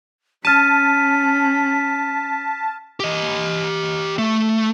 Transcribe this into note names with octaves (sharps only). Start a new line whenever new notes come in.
C#4 A5 F6 B6 D#7
G4 D#5
A3